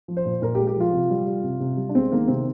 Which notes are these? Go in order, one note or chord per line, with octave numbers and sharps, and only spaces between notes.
F3
C5
A#2
A#2 A#4
G4
G#3
G4
F3 F4
C3
G3
G3
C3
C3
G3
D4
G#3 C4
D#3 A#3
C3 C4